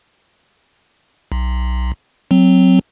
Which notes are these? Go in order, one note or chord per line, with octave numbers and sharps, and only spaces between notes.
B1
F#3 C4